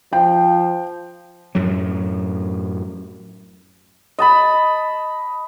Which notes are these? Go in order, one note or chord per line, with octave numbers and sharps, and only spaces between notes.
F3 G5
F#2 A2 F#3
D#5 A5 B5